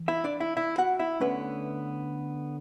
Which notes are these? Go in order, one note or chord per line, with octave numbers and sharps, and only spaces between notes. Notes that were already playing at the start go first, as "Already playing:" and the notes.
Already playing: E3
E4 E5
D4 D5
E4 E5
E4 E5
F#4 F#5
E4 E5
D3 A3 B3 C#4 B4